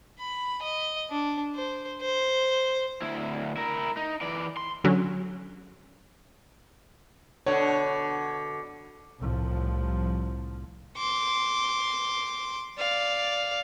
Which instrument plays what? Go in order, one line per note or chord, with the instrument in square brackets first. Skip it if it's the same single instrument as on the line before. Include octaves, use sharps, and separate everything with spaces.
[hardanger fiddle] B5
D#5
D4
C5
C5
[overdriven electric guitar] D2 E4
E4 A#4
D#4
E3 D5
C6
[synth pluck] D3 F#3 C#4
[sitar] B2 D3 [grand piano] C#5
[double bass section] C2 A2 F3
[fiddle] C6 D6
D5 F5